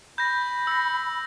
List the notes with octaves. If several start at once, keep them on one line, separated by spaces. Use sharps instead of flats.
B5 G6 A#6
E6 A#6